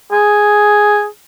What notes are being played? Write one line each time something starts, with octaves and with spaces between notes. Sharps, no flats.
G#4